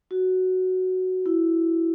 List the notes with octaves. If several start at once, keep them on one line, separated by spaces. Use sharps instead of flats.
F#4
E4